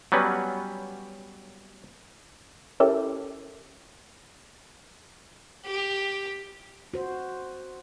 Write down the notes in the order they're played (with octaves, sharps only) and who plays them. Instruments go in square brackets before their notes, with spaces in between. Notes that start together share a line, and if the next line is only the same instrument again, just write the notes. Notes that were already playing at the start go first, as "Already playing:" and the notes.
[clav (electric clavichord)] F#3 G3 B3 C#4 B4
[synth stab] C#4 E4 G4 A4 A#4
[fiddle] G4
[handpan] F#4 C5